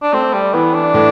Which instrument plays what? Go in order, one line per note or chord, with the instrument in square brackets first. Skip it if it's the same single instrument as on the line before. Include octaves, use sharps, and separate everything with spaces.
[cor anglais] D4
[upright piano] A3 [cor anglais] C4
[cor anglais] G3
[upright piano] E3 [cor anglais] B3
[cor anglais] D4
[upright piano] A2